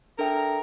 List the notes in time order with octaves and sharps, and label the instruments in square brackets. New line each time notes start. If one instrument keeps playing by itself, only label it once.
[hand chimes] D4 A4 E5 G5 [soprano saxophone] A#4